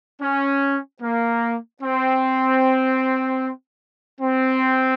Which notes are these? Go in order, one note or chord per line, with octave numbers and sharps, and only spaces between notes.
C#4
A#3
C4
C4